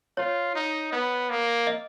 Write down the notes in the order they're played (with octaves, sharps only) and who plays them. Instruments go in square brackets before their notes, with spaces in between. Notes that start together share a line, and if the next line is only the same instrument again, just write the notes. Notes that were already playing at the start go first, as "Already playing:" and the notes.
[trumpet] F4 [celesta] C#5
[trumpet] D#4
B3
A#3
[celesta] D#5